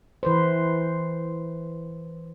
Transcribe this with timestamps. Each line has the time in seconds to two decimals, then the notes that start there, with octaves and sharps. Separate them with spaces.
0.23 E3 B4 C5